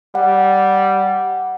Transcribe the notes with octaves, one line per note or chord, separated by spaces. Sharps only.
G3 F#5